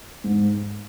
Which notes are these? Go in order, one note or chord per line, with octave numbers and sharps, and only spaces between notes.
G#2